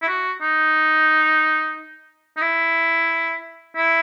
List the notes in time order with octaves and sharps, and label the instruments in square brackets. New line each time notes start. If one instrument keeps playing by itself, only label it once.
[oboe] E4
F#4
D#4
D#4
E4
E4